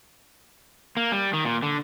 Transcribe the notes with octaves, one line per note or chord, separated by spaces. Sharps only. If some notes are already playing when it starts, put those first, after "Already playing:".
A#3
G3
D#3
A#2
D3